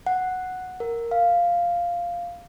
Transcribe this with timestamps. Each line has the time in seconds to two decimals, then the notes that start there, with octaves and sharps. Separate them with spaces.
0.07 F#5
0.80 A#4
1.11 F5